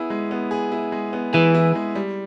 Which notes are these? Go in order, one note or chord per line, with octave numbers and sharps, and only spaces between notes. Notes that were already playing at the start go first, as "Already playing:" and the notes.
Already playing: B3 E4 G#4
G#3
B3
G#4
E4
G#3
B3
E3 G#4
E4
G#3
G3